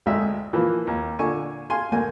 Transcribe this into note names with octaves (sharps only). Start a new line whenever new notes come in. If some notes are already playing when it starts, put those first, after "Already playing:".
G#1 D2 G#3 E5
E3 F3 A#3 B4
D#2
A#2 D3 G#5 C#6
F5 G#5 C6
D2 A#3 G#5